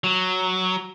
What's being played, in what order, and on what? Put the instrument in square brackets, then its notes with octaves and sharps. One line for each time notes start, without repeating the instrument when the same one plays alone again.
[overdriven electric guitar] F#3